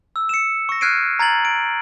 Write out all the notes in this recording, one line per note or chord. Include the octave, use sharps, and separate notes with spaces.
E6
C#7 E7
C#6 A#6
F6 F#6 G#6 C7 D7 D#7
A#5 G#6 A6 F#7
D7